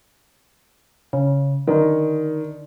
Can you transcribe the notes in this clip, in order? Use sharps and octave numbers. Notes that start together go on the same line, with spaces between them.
C#3
D3 D#3